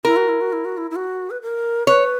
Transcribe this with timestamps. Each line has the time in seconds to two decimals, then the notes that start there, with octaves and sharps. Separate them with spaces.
0.05 E4 A#4
0.16 F#4
0.28 E4
0.41 F#4
0.53 E4
0.65 F#4
0.77 E4
0.91 E4
0.96 F#4
1.30 B4
1.42 A#4
1.87 B4 C#5